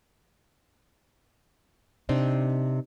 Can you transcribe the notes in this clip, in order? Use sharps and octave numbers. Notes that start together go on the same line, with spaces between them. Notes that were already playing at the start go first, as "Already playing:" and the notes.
C3 C4 D4 D#4